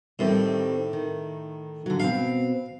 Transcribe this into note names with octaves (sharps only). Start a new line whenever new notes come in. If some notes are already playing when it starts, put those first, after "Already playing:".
A2 D#3 G3 C4
D#3
D3 F#3
B2 C4 F5